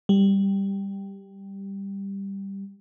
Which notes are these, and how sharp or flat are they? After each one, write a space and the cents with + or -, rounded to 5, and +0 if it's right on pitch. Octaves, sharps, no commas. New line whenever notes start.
G3 +5